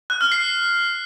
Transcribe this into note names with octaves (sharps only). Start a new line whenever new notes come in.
F#6
F6
C7